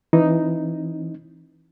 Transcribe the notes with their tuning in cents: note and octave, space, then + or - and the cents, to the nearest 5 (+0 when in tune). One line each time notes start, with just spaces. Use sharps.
E3 +0 C4 +35 D#4 +0